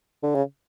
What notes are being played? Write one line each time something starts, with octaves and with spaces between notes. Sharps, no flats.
D3
C#3